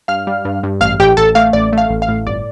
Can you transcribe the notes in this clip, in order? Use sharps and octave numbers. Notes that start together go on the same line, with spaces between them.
G2 F5 F6
G3
G2
G2
A1 F5 F6
A1 G4 G5
A1 A4 A5
A3 F5
A1 D5
A3 F5
A1
F5
A2
G1 D5